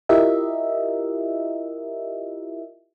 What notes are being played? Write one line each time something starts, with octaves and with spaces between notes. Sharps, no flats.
E4 F4 G4 A#4 D#5 E5